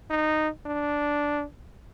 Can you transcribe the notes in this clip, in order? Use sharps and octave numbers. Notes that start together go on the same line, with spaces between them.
D#4
D4